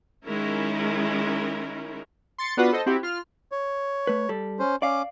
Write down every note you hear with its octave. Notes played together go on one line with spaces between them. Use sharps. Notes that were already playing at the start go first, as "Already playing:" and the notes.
D#3 G#3 C#4 E4 A#4
C6 A6 C#7
B3 D4 F4 F#4 B4 F#5
A4 C5 D#5
C4 E4 F#4 G4
F4 F6
C#5
A3 B4
G3 A4
C#4 C5
C#4 D5 F5 D6